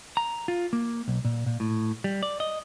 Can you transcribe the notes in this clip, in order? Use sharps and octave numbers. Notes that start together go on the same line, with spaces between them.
A#5
F4
A#3
B1
A#2
A#2
A2
G3
D5
D#5